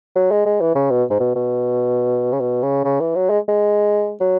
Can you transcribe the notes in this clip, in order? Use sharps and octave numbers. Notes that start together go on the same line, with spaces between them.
F#3
G#3
G#3
E3
C#3
B2
G#2
B2
B2
C#3
B2
C#3
C#3
E3
F#3
G#3
G#3
F#3